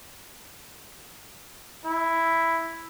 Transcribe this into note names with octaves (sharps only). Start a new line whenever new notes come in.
E4